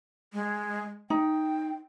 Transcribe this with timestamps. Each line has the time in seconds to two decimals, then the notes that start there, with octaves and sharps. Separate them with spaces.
0.33 G#3
1.10 D#4 G5